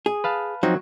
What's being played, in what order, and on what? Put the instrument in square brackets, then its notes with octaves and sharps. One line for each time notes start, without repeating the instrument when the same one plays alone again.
[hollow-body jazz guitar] G#4
[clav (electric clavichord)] B4 F5 A5
[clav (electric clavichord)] F3 C4 D#4 [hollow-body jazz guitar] F#3